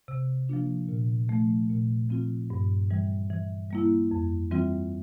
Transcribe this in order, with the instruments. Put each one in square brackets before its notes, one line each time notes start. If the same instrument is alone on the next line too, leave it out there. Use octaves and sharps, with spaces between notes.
[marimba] C3
F3 A#3 D4 F4
A#2
F3 A3
A#2
F3 C4 F4
G2
E3 G3
E3
G3 A#3 E4
F2
E3 G3 C4 F4